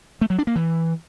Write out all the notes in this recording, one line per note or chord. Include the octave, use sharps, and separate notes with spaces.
A3
F#3
D4
A#3
E3